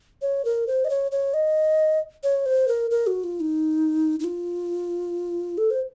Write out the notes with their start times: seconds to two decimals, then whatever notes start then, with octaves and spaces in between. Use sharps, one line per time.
0.22 C#5
0.45 A#4
0.67 C5
0.85 D#5
0.90 C#5
1.12 C#5
1.34 D#5
2.23 C#5
2.46 C5
2.68 A#4
2.91 A#4
3.07 F#4
3.24 F4
3.40 D#4
4.20 D#4
4.24 F4
5.58 A4
5.70 C5